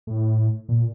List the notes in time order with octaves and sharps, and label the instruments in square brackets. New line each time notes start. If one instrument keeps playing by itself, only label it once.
[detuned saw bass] A2
A#2